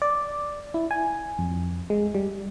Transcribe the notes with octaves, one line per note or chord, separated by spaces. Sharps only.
D5
E4
G#5
F2
G#3
G3